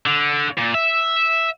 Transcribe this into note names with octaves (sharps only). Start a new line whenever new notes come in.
D3
A#2
E5